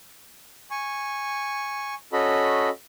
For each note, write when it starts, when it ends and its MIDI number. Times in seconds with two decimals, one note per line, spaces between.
0.71 1.94 80
0.71 1.94 85
2.13 2.69 61
2.13 2.69 66
2.13 2.69 69
2.13 2.69 75
2.13 2.69 83